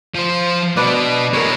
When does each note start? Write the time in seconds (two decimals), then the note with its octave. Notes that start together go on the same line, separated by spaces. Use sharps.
0.15 F3 C5
0.76 B2 D4 B4 D5
1.33 G#3 E4 A#4 C#5